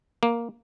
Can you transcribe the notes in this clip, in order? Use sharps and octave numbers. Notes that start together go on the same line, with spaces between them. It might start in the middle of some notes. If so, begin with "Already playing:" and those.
A#3